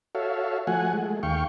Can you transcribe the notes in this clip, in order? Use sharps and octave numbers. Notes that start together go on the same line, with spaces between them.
F#4 A4 C#5 E5 F5
F3 A3 F#4 F#5 G#5
G#3 A3
D#2 F5 G5 C#6